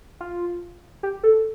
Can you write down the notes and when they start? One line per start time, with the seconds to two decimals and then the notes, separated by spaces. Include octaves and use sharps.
0.20 F4
1.03 G4
1.23 A4